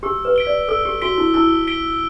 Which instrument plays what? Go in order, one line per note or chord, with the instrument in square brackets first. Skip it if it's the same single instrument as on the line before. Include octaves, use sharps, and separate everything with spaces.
[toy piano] G4 [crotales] E6
[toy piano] B4
[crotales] B6 D7 G7
[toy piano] D5
[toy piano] A4 [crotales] E6
[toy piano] G4
[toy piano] F#4 [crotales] B6 D7 G7
[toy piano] E4
[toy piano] E4 [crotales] E6
[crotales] B6 D7 G7